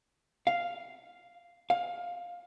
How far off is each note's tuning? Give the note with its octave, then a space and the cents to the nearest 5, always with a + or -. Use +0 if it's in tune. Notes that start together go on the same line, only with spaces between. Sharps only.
F5 -5
F5 +10